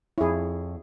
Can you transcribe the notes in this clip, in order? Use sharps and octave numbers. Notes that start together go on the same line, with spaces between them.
F2 E4 G#4 C#5